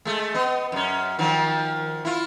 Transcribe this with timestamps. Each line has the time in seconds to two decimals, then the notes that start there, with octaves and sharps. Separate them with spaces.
0.05 G#3 A3
0.34 B3 D#5
0.72 F#2 C#4
1.19 D#3 F3 F#3
2.05 E4 F4